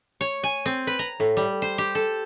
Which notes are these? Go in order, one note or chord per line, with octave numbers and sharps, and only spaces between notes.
C#5
G#5
C4
B4
A#5
A2
G3
C5
G4
A4